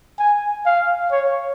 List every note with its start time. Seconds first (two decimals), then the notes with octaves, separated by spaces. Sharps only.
0.19 G#5
0.66 F5
1.11 C#5